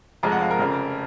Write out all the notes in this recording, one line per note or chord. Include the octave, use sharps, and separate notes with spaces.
F1 F2 F3 G#3 A#5
F#5
F5
A#4
F1 F2 C#3